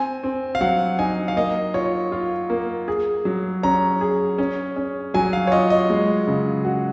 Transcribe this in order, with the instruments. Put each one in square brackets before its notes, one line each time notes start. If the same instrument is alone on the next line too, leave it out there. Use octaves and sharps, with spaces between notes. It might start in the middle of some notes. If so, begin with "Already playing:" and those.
Already playing: [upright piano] C4 [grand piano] G#5
[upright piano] C4
[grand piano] F5
[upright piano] F#3 [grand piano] F#5
[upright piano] D#4 [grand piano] G#5
[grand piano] F5
[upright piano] A#3 [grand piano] D#5
[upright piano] F4 [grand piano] C#5
[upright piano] F4
A#3
G#4
F#3
[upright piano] C#4 [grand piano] A#5
[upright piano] G#4
C#4
C#4
[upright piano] F#3 [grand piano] G#5
[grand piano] F5
C#5
[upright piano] F4 [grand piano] D#5
[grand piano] D#5
[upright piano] G#3
C#3
F#4